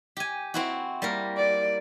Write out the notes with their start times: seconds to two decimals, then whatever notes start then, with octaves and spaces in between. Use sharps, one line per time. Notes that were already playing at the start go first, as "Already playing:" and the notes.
0.17 G4 G#5
0.54 C4 E4 F#4
1.02 G3 A#3 A#4
1.37 D5